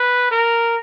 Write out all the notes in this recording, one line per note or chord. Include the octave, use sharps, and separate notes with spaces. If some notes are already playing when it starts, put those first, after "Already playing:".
Already playing: B4
A#4